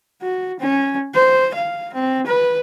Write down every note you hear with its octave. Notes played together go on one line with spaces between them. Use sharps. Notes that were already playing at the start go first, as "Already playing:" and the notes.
F#4
C#4
C5
F5
C4
B4